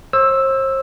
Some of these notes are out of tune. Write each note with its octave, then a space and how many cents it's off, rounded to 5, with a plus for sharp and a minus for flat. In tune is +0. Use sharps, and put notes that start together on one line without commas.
C5 +40 E6 +0